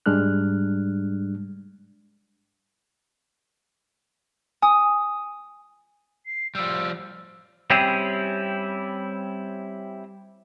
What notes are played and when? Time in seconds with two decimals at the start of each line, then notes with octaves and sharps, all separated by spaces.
0.06 G#2 G3 G#3 D4 F6 F#6
4.62 G#5 D#6
6.26 C7
6.55 F3 G3 E6
7.70 G3 C4 C#4 E4 G4 G#4